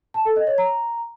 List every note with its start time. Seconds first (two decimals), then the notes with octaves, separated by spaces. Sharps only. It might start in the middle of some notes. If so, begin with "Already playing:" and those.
0.14 A5
0.25 A4
0.36 D#5
0.47 C#5
0.58 A#5